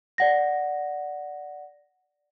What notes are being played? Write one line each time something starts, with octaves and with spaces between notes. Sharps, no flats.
D5 F#5 A#6